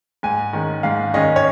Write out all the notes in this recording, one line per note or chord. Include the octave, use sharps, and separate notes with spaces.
G#2 G#5
D#3 G#3 C#4
G#2 F5
D#3 G#3 C#4 D#5
C#5